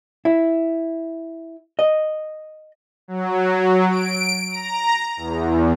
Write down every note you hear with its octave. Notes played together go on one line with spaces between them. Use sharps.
E4
D#5
F#3
D7
A#5
E2